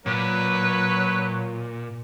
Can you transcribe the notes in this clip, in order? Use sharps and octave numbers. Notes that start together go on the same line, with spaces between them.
A#2 F#3 B4